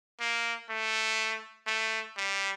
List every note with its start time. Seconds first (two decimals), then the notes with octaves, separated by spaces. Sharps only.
0.20 A#3
0.70 A3
1.67 A3
2.17 G3